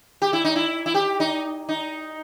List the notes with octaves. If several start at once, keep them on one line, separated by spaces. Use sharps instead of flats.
G4
E4
D#4
E4
E4
G4
D#4
D#4